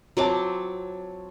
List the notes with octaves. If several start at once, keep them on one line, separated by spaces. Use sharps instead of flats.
F#3 C4 F4 C#5 A5 D6